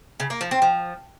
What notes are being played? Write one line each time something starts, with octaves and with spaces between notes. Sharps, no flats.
C#3
A#3
F3
C4
F3